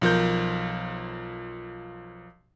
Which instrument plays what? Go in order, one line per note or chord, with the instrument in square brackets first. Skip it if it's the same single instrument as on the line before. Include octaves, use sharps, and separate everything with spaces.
[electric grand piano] B1 F3 A#4 G6